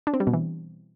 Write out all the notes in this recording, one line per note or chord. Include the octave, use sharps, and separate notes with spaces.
D4
C4
G3
B2
E3